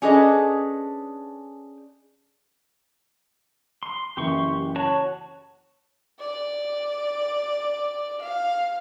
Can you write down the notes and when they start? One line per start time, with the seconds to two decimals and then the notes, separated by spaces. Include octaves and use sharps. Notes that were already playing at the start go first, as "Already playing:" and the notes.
0.02 C#4 D4 G#4 A4 B4 D#5
3.83 C6
4.17 F#1 E3 G4 C6 C#6
4.76 F#4 C#5 A5
6.19 D5
8.23 F5